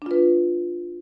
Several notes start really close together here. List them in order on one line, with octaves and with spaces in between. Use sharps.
D4 F4 B4